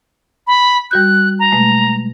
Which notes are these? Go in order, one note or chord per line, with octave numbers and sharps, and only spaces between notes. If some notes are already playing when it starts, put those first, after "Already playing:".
B5
G3 F#4 F#6 G6
A#5
B2 G#3 A3